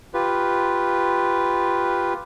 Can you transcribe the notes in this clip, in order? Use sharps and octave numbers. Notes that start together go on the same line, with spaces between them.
F4 G4 B4